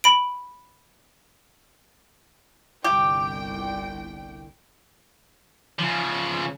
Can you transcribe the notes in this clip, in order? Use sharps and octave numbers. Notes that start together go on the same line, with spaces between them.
B5 D7
G1 C2 G4 G5
C#3 F3